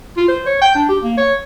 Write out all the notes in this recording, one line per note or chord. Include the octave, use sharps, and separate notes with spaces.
F4
C5
C#5
G5
D4
G4
A#3
C#5